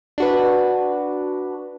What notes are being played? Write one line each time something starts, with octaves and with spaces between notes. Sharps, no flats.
D4 F#4 B4